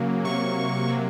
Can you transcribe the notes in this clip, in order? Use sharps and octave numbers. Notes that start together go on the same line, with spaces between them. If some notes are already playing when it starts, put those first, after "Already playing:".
Already playing: C#3 F#3 A#3
C3 F#3 A#3 C#6
C3 F#3 A#3